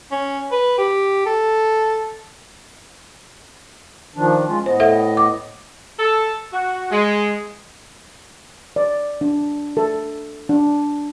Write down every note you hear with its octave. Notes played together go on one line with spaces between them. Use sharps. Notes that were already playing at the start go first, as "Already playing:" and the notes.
C#4
B4
G4
A4
D#3 F3 D4
G#3 C#4 F4
A2 B3 C5 D#5
A4 E5 F#5
D6
A4
F#4
G#3
D5
D4
A4
D4